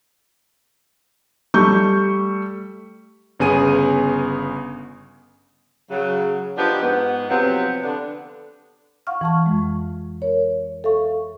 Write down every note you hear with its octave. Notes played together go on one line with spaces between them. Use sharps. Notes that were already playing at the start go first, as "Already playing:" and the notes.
G3 A3 C#6 G6
G1 C#3 B3 G#4 G#5 D#7
C#3 F#3
F3 B3 D4 D#4 G4
G#2 B3
C3 F3 F#3 B3 C4
D3 B3 D4
F5 F#5 C#6 F6
E3 A5 C#6
F2 G#3
A#4 C#5
A4 E5 F5 C#6